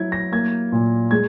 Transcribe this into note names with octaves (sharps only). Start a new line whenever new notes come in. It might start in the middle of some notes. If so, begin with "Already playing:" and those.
Already playing: F#3 E4 G#6
A#6
A#3 G#6
A#2
G#3 G#6